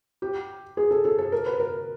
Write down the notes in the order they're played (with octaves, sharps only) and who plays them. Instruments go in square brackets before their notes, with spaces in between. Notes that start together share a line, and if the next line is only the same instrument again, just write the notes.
[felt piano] G4
G#4
A4
A4
A4
A#4
B4
A#4